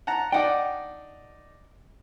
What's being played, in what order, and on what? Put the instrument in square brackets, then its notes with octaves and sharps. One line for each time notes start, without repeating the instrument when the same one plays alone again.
[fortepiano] F#5 A5 A#5
[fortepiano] D4 D#4 D5 [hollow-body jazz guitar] F#5 G5